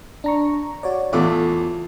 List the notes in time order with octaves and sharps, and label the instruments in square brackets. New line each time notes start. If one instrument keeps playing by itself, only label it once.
[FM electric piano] D4 A#5 C#6
F#4 C#5 D5
[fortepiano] E2 A3 D6 [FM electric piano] F4